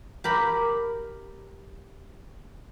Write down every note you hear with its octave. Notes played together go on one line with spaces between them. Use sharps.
G4 A#4 B5